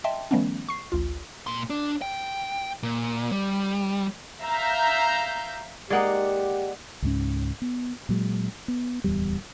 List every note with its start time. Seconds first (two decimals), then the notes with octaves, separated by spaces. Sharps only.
0.04 D#5 E5 G5 A5 C6
0.31 D#3 F3 G3 A3 B3 C#4
0.69 C#6 C7
0.92 A1 D2 F4
1.47 A#2 C6
1.70 D4
2.02 G5
2.83 A#2
3.32 G3
4.42 E5 F5 A#5 G6
5.90 G#3 A#3 D#4 G4 D5 F#5
7.02 C#2 G#2 C#4
7.62 B3
8.09 A#2 F#3 G#3
8.68 B3
9.04 D1 E2 G3